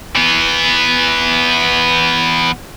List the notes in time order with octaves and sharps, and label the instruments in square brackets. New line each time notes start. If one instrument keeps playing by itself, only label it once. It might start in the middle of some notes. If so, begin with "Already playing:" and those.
[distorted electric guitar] E3 B3